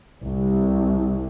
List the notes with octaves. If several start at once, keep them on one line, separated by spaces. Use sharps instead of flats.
C2